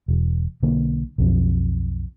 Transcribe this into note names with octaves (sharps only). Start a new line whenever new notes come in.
E1
B1 D3 A#3
B1 F2